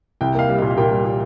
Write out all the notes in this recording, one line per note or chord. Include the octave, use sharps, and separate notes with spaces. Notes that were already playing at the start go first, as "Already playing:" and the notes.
C2 G5
A#3 F5
G3
F5
A#2
F5
A#2 G5
G3
A#2